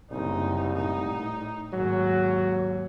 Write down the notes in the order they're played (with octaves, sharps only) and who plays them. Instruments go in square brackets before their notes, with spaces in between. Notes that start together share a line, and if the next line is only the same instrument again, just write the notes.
[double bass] F#1 D#4 [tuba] C2
[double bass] A2 D#4
[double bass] D#2 G#2 [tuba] F#3